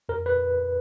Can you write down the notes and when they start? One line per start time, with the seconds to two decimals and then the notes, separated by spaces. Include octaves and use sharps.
0.09 F2 A#4
0.26 B4